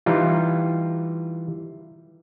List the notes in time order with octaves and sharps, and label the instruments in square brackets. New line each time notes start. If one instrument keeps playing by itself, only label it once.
[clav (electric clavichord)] E3 G3 D#4 F4